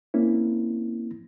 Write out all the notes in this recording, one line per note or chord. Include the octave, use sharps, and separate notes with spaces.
A#3 C4 C#4 E4